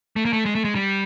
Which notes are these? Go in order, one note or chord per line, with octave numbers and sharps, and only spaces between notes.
A3
A#3
A3
G#3
A3
G#3
G3